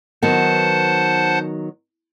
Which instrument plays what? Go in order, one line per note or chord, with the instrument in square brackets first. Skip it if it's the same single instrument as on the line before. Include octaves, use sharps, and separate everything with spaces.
[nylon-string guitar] D#3 F#3 B3 [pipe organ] C5 F#5 A5